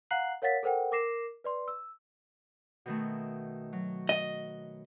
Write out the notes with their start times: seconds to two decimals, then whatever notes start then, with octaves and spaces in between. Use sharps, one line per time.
0.11 F5 F#5 A#5 F#6 C7 F#7
0.42 A#4 C#5 F5 F#5 A6 B6
0.63 A4 A#4 C5 F#5 G5
0.92 A#4 D6 A#6 C7 E7
1.44 B4 D5 C6
1.68 E6
2.86 B2 D#3 A3
3.73 F#3
4.09 D#5